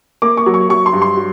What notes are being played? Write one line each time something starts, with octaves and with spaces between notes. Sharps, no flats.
A#3 D6
C#6
F#3
C#6
F#3 C#6
C6
G2
C6
F#3